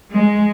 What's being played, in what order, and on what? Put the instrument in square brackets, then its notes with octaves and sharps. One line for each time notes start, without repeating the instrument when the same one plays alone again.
[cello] G#3